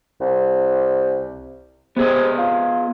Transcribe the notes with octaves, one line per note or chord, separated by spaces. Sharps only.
C2
C3 B3 G#4 D#5
F4